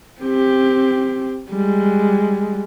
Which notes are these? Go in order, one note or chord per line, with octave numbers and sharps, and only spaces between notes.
C4 G4
G3 G#3